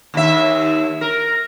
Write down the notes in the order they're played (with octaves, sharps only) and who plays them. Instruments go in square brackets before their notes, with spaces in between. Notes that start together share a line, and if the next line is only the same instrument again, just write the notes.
[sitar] D#2 E5
A#4